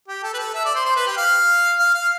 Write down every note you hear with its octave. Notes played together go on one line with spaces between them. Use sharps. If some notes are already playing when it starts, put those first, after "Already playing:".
G4
A4
B4
A4
E5
D5
C5
C5
B4
G4
F5
F5
F5